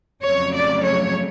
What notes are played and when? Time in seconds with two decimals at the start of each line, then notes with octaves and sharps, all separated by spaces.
0.25 F2 C#3 F#3 A3 C#5
0.54 D5
0.83 C#5